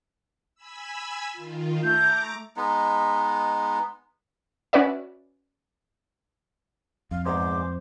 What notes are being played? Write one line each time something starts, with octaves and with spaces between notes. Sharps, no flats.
G#5 B5 E6
D#3 F4
A3 A#5 D6 G6
G#3 B3 D#4
C#4 F#4 B4 D5 E5
F2 F5
E2 G#2 G#3 C5 D6